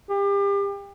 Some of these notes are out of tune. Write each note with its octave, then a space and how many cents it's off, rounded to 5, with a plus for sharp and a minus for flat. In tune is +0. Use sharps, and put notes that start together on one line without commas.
G4 +35